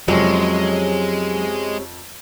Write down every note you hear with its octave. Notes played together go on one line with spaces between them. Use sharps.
F2 C3 F#3 G#3 C#4